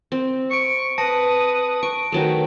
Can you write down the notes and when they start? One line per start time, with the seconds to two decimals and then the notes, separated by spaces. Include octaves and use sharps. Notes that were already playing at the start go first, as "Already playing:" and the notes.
0.12 C4
0.51 C#6 C#7 D7
0.98 B4 A5 D#6 A#6 C#7
1.83 C#6 D7
2.12 D#3 F#3 A3 B4 G5